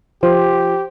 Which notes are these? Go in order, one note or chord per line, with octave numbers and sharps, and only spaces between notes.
F3 G4 C5